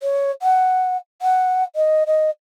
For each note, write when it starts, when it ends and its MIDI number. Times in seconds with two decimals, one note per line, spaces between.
0.01 0.31 73
0.42 0.97 78
1.22 1.63 78
1.75 2.03 75
2.06 2.30 75